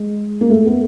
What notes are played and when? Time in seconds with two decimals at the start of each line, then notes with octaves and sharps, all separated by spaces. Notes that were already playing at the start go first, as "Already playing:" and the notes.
Already playing: G#3
0.41 A#3
0.50 A3
0.65 B3